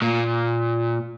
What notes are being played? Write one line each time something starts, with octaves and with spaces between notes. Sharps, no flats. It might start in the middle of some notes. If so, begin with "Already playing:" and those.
A#2